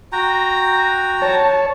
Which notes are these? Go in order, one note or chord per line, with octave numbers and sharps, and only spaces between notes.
F#4 G5 A#5
C#5 A5